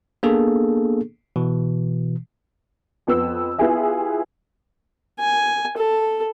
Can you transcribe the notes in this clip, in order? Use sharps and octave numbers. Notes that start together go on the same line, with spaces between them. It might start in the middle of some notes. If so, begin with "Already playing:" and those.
A#3 B3 D4 G#4 A4
B2 E3
F2 B3 E6
B3 E4 F4 G4 G#4 E5
G#5
A4